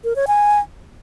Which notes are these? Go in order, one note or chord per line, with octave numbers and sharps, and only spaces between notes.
A#4
C#5
G#5